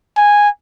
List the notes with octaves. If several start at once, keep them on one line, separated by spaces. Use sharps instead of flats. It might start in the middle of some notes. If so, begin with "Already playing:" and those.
G#5